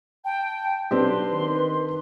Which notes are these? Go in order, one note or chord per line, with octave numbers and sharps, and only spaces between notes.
G5 A5
B1 C4 D4 G4 B4 C6
D#3